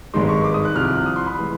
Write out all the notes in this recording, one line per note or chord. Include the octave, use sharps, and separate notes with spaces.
G#1 G2 D#3 G#3 C6
C#6
D6
D#6
F#6
C2 C3 F3 F6
F6
F#6
D#6
C6
B5
E3 G#3